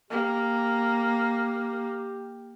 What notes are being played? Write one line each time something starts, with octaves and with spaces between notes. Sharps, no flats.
A#3 G4